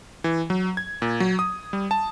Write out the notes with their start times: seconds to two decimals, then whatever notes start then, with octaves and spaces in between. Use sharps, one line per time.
0.24 E3
0.50 F#3
0.77 G#6
1.02 A#2
1.20 F#3
1.39 D#6
1.73 G3
1.91 A5